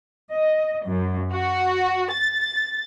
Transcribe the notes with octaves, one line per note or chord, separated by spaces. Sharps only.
D#5
F#2
F#4
A6